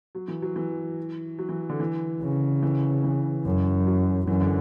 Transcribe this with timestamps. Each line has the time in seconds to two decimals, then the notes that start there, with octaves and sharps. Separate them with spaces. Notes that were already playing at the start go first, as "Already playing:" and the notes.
0.15 F#3
0.28 E3
0.42 F#3
0.56 E3
1.39 F#3
1.49 E3
1.69 D3
1.80 E3
2.22 C#3
2.63 E3
3.04 E3
3.45 F#2
3.87 F#3
4.27 F#2 E3
4.41 D3